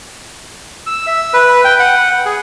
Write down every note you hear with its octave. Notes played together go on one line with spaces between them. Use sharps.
E6
E5
B4
G5
F#5
G#4